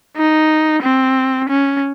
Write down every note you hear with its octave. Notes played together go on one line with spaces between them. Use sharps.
D#4
C4
C#4